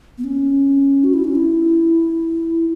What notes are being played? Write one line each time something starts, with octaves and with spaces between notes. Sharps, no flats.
B3
C#4
F#4
E4
C#4
E4